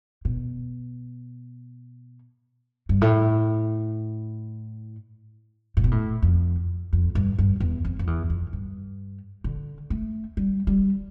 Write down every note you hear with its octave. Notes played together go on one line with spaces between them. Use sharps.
B2
G2
A2
A2
B2
A2
F2
F2
G2
G2
E2
F2
F2
E2
F2
G2
D3
A3
G3
G3